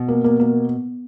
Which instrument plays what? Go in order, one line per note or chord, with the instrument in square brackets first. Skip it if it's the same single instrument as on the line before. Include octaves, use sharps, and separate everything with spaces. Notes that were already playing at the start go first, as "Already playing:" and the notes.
Already playing: [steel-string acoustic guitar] B2
[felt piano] A#3
A#3
A#3